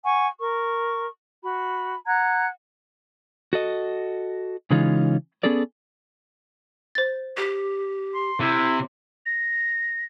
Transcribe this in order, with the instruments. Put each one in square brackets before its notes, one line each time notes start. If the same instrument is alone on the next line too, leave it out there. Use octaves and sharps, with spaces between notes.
[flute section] F#5 G#5 C#6
A#4 C#6
F#4 B5
F#5 A#5 F#6 G#6
[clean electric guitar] F#4 A4 D#5
C#3 E3 G#3 C#4 D#4 F4
B3 C#4 G#4 A4 D5
[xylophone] C5 A6
[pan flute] G4
[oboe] C6
[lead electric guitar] C3 [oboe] E4
[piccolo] A#6